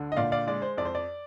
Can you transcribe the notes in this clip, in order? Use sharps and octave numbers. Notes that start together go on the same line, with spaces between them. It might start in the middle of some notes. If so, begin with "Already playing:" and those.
Already playing: D2 D3
D#5
A#2 D5 F5
D5 F5
G#3 D5
C5
F2 D5
C5
D5